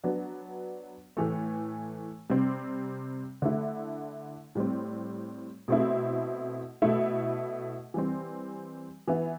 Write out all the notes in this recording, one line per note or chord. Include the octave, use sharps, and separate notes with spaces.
F#3 B3 D4
A2 E3 A3
C3 G3 C4
D3 A3 E4
A2 G3 C4
B2 A3 C4 E4
B2 A3 E4
E3 G3 C4
E3 B3 E4